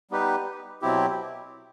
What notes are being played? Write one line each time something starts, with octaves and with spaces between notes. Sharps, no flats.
G3 B3 D#4 G4 B4
B2 F#3 C4 E4 G4